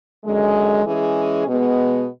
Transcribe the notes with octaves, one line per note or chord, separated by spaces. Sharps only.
F#2 D3 G#3
E3 G#3 C#4 G#4
B2 G#3 B3